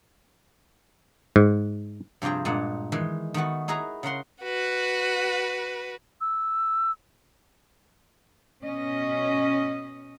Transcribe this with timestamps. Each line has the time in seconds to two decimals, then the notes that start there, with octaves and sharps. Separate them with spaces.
1.36 G#2
2.22 G2 C3 F3 G#4 G5
2.45 G2 A#2 G#3 D#4 F#5
2.92 D#3 E3 G#3
3.34 D#3 A3 B3 F#4
3.68 D#4 E4 G#4 B4 A#5
4.03 C#3 A#4 F#5 C6
4.42 F#4 B4
6.21 E6
8.63 B2 C#4 D#5